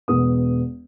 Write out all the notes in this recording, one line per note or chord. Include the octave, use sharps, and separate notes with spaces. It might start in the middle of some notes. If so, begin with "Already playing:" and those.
E1 B3 D#6